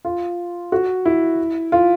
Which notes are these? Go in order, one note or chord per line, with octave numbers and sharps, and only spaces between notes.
F4
F#4
E4
F4